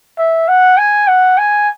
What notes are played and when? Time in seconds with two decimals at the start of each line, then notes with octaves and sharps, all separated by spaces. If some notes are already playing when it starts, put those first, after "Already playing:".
0.18 E5
0.48 F#5
0.78 G#5
1.08 F#5
1.38 G#5